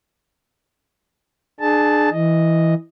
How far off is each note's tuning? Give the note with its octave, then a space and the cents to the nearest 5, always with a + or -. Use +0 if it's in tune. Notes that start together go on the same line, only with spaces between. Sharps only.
D4 +25 G#4 +20 A5 +0
E3 +0 D#5 +0